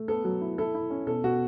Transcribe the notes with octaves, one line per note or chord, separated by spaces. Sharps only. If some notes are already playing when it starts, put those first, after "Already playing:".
Already playing: A3
B3 A4
F#3
E4
E4 A4
E4
C#4
B2 A4
B2 F#4